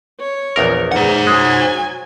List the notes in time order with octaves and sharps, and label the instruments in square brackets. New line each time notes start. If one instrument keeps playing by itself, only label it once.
[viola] C#5
[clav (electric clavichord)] A#1 E2 A#4
[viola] D#4 G#4 [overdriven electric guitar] C5 F#5
[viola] F#3 G#5 [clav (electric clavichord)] G#3